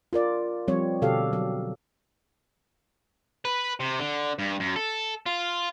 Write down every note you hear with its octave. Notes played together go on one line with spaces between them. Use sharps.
F4 A#4 D5
F3 G3 C4 C#5
B2 D3 G4 A4 F5
F#3
B4
C3
D3
G2
F#2
A4
F4